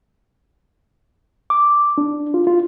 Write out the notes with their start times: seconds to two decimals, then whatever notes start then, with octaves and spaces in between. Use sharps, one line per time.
1.50 D6
1.98 D4
2.34 F4
2.47 F4